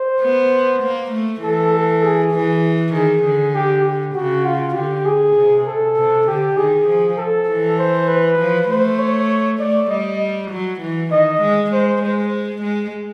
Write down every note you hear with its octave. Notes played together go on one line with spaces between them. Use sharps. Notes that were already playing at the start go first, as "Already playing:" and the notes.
Already playing: C5
B3
A#3
A3
E3 A4
A4
G#4
E3
D#3 G#4
D3
G4
G4
C#3 F#4
F4
D3 G4
G#4
C3
A4
C3
D3 G4
D#3 G#4
F3
A4
E3
C5
B4
F3
A3 C5
C#5
A3 D5
G3 D#5
F#3
E3
D#3 D#5
G#3
G#3 C5
G#3 C5
G#3